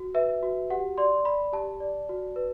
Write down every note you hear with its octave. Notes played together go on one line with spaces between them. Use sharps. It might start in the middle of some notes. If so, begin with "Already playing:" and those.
Already playing: F#4
B4 E5
F#4
G4 F#5
D5 C6
D5 B5
G4 A5
D5
F#4
B4